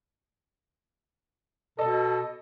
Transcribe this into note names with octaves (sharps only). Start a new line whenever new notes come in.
B2 A4 D#5